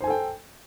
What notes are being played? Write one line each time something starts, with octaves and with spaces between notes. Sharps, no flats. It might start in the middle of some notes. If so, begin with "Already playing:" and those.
A4 C5 G5 G#5